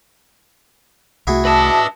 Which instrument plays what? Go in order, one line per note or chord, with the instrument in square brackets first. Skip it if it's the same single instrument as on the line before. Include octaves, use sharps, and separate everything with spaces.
[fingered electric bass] C2 A3 [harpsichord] E4 F#4 G#4
[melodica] D4 D#5 E5 [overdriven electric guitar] B4 A5